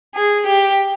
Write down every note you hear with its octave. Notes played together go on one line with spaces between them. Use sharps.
G#4
G4